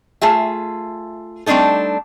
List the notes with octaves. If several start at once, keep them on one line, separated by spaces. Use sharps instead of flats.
A3 F4 G#4 E5
G3 A3 C4 D4 D#4 A4